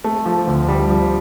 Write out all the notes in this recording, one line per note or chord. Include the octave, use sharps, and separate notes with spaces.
A3
F3
D2
G3
F3